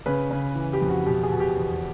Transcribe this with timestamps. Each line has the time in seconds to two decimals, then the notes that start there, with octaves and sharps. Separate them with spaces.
0.06 C#3 B4
0.31 C#3
0.55 E3
0.73 G4
0.82 F2
0.89 F#4
1.06 B2 G4
1.23 G#4
1.32 B2
1.40 G4
1.56 E2